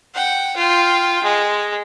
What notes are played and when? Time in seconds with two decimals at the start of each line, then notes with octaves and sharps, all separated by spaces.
0.14 F#5 G5
0.56 F4 G5
1.23 G#3